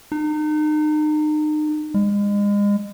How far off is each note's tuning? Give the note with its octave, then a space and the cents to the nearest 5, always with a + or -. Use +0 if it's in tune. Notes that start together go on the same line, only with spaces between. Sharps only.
D#4 -35
G#3 -35